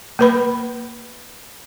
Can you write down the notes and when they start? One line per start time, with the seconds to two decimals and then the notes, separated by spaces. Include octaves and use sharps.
0.19 A#3 B4 B5